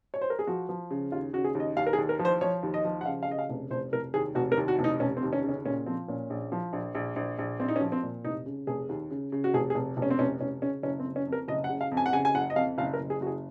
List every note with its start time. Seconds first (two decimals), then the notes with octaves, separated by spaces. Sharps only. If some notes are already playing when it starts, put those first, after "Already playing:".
0.14 C#5
0.21 C5
0.30 A#4
0.39 G#4
0.47 F3 F#4
0.69 F3
0.91 C#3
1.12 D#2 F4
1.33 C#3 F#4
1.44 G#4
1.55 D#2 D#5
1.77 D#2 F5
1.87 A#4
1.93 G#4
1.98 D#2
2.09 A#4
2.19 F3
2.25 C5
2.41 F3 C#5
2.63 D#2
2.74 D#5
2.85 F3
3.01 F#5
3.06 C#3 F5
3.23 F5
3.28 C#3 D#5
3.38 F5
3.49 F1
3.71 F1 C5
3.92 F1 A#4
4.14 D#2 G#4
4.35 F1 F#4
4.52 A#4
4.57 D#2
4.68 F#4
4.79 F1
4.84 D#4
5.00 F1 C#4
5.17 C4
5.23 D#2
5.33 C#4
5.44 C#3
5.49 C#4
5.65 A#2 C#4
5.86 F3 C4
6.08 A#2 C#4
6.30 A#1
6.52 F3
6.73 A#1
6.95 A#1
7.16 A#1
7.38 A#1
7.59 A#1 C4
7.68 D#4
7.76 C#4
7.81 F3
7.92 C4
8.03 A#2
8.24 F1 D#4
8.46 C#3
8.67 F1 G#4
8.89 D#2
9.11 C#3
9.32 C#3
9.44 F#4
9.54 F1 G#4
9.70 G#4
9.75 F1
9.97 F1
10.02 C#4
10.11 C4
10.19 F1 C#4
10.40 F1 C#4
10.62 C#3 C#4
10.83 F#1 C#4
11.00 C4
11.05 F#1
11.16 C#4
11.27 F2
11.32 A#4
11.48 F#1 D#5
11.64 F#5
11.69 C#3
11.81 F5
11.92 F2
11.97 G#5
12.06 F#5
12.13 C#3 G#5
12.25 G#5
12.35 F#1 F#5
12.50 D#5
12.56 F2 F5
12.78 F#1 F5
12.94 A#4
12.99 F#1
13.10 G#4
13.21 F#1 F#4
13.27 G#4